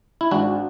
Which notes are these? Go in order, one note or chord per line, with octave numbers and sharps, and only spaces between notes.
E4
G#1 D4 F#4